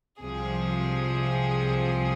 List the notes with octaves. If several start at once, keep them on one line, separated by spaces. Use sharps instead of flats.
C2 C3 F3 G#4